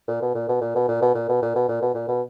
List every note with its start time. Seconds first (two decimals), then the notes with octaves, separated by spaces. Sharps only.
0.08 A#2
0.21 B2
0.34 A#2
0.48 B2
0.61 A#2
0.75 B2
0.88 A#2
1.01 B2
1.14 A#2
1.28 B2
1.42 A#2
1.55 B2
1.68 A#2
1.81 B2
1.94 A#2
2.08 B2